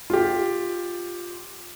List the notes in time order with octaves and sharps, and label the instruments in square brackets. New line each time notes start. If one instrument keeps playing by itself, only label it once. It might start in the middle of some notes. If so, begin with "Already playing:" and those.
[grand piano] F4 G4